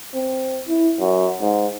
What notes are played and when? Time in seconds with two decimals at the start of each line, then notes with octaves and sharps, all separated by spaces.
0.15 C4
0.68 E4
0.99 F#2
1.41 G#2